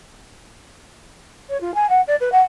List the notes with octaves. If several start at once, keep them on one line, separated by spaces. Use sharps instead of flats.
C#5
F4
G#5
F#5
D5
B4
F#5